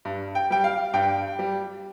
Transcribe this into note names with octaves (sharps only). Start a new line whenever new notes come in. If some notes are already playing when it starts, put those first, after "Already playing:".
G2
G5
G3 G5
F5
G2 G5
G3